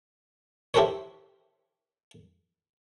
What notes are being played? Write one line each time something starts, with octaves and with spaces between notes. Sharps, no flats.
E4 G4 A4 A#4 C5 C#5